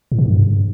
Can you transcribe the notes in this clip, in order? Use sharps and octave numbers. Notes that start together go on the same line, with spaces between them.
A2
C3
G2